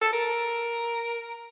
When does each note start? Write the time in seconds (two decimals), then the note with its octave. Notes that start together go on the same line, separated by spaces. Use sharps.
0.01 A4
0.12 A#4